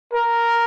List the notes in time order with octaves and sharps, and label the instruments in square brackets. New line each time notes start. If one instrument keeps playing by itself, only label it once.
[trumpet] A#4